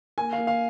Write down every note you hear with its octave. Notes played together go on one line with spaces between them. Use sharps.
A#3 G#5
F5
A#3
F5